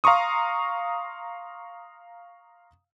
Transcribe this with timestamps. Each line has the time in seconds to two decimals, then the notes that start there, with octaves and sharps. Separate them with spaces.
0.04 F5 A#5 C6 C#6 D#6